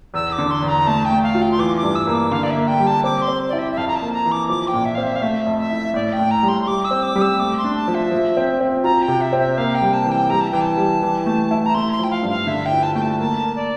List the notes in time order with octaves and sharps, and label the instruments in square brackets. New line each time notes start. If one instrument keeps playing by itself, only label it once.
[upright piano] E2 [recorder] E6
[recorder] D6
[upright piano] D3
[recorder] C6
[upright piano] E2
[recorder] A#5
[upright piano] A3 [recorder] A5
[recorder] G5
[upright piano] A3
[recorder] F5
[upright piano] F4
[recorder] G5
C6
[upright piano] E3 [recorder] D6
[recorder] D6
[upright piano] G2
[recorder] E6
[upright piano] A#3
[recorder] D6
[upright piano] D3 [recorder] F5
[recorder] D5
E5
[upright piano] A#3
[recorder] G5
[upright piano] G3
[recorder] A5
[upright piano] C4 [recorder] D6
[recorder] C6
[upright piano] C4
[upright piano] E4 [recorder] D5
[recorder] E5
E5
[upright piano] F2 [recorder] F5
[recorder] A#5
A5
[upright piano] A#3
[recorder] A#5
[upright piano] E3
[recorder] D6
[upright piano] F3 [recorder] D6
[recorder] G5
[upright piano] A#2
[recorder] E5
[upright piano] C4 [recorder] F5
[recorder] E5
F5
[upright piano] A3 [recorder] E5
[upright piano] F2
[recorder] E5
[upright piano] E4
[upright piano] A2 [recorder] D5
[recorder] G5
[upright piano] A2
[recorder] A#5
[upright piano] G3
[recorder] C6
C6
[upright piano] G3 [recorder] D6
[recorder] E6
[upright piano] C4
[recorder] D6
[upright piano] G3
[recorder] E6
[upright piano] A3 [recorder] D6
[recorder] C6
[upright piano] D4
[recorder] A5
[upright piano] F3
[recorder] E5
[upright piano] F3
C4
C4
[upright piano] F4 [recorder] A#5
[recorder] G5
[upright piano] C3
[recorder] E5
[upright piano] C4
[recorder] E5
[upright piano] A#3 [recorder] F5
[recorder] G5
[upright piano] G3
[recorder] A5
[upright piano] E3
[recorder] G5
[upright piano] G3 [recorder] A#5
[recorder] A5
[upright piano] E3 [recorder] G5
[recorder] A5
[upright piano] G3
E3
A3
E4
[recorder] A#5
[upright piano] A3 [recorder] C6
[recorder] C6
[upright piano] F3 [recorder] G5
[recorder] F5
[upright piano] G2
[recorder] F5
[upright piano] D3 [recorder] E5
[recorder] G5
[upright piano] E4
[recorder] A5
[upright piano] A3 [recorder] G5
[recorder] A5
[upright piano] A#3 [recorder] A5
[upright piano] A#3
[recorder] D5